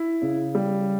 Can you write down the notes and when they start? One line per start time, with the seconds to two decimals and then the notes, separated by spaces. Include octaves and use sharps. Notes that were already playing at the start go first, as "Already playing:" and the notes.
Already playing: E4
0.22 C#3
0.55 G3